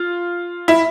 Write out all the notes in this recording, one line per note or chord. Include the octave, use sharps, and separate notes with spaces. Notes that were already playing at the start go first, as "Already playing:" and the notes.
Already playing: F4
E4